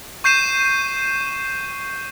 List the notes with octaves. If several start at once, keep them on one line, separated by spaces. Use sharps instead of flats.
C#6 G6 C7 D#7 E7